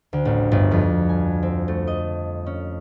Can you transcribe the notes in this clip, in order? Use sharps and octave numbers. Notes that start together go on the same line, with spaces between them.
D2
A1
G1
F2
G#5
C4
A3
D#5
C#4